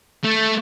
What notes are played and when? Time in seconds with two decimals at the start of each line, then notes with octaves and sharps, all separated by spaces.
0.24 A3